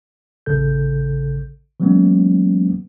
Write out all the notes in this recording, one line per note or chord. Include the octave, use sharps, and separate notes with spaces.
A1 C#3 A4 G6
E3 F#3 G#3 A#3 B3 C#4